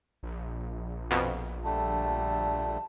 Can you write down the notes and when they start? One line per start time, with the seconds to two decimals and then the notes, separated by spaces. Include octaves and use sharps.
0.23 A#1
1.11 F2 B2
1.64 D3 G3 A3 A5